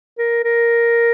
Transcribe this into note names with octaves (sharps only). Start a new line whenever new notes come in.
A#4
A#4